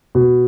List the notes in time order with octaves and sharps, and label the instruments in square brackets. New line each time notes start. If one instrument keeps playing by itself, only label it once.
[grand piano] B2